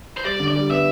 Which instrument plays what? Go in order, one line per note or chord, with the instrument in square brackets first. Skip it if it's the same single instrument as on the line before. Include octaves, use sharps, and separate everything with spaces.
[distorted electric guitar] C5
[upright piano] G3 [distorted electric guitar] D5
[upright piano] D3
[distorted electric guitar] D5
[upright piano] G3
[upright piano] B3 [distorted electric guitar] E5